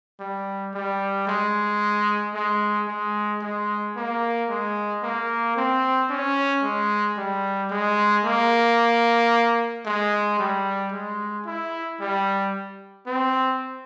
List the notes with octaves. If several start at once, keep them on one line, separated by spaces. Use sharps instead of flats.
G3
G3
G#3
G#3
G#3
G#3
A#3
G#3
A#3
C4
C#4
G#3
G3
G#3
A#3
G#3
G3
G#3
E4
G3
C4